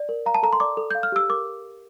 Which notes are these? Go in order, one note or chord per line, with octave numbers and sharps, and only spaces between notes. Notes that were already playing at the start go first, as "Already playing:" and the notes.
Already playing: D5
A#4
F5 A#5
A5
A4 A#5
C6
D5 D6
A4
F5 G6
F6
G4 E6
A#4 D6